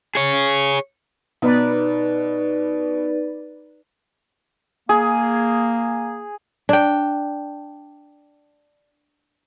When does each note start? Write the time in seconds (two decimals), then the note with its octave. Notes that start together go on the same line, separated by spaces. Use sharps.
0.15 G#4 C#5
1.42 B2 D#4 B4 D5
4.89 A#3 G#4
6.69 D4 G5